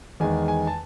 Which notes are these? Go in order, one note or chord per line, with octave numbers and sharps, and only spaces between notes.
E2 D#3 G#3 G#5
G#5
A5